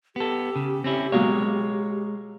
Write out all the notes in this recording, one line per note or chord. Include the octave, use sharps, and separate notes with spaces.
B3 G4 A4
C#3
C4 C#4 E4
B2 F#3 G#3 A#3 C#5